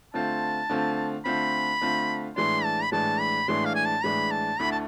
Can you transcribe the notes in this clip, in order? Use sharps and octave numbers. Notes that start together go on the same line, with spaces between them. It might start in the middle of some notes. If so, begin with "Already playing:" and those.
D3 A3 C4 F4 A5
D3 A3 C4 F4
D3 A3 C4 F4 B5
D3 A3 C4 F4
A2 E3 G#3 D4 C6
A5
B5
A2 E3 G#3 D4 A5
B5
A2 E3 G#3 D4 C6
F5
G#5
A5
A2 E3 G#3 D4 B5
A5
D2 D3 A3 E4 B5
A5